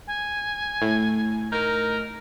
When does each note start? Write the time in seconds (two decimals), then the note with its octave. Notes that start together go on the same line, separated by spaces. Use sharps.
0.07 G#5
0.82 A2
1.52 D#4 A#4